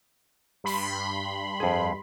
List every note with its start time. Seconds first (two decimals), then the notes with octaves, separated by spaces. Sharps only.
0.64 G2 B5 C6
1.60 F2 G#4